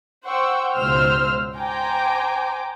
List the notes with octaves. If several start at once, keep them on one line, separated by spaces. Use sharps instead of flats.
C5 F#5 G5 C#6 E6
C#2 G#2 B2 C5 E6 F6
C5 G5 G#5 A#5 D6